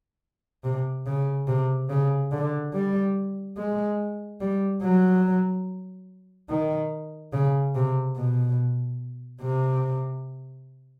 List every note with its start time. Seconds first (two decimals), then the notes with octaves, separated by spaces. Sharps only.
0.64 C3
1.06 C#3
1.48 C3
1.89 C#3
2.32 D3
2.73 G3
3.57 G#3
4.40 G3
4.82 F#3
6.49 D#3
7.33 C#3
7.75 C3
8.16 B2
9.42 C3